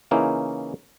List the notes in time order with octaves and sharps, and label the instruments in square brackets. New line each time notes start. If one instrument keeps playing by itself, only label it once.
[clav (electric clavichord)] C#3 E3 A#3 C#4 D#4 E4